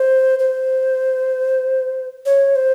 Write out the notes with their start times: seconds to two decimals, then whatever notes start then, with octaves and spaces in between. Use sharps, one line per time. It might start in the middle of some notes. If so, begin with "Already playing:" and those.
Already playing: C5
0.39 C5
2.26 C#5
2.56 C5